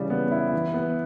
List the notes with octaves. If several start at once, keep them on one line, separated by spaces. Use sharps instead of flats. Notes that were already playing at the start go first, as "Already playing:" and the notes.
Already playing: C#3 E3 G3
B3
E4
E3
B3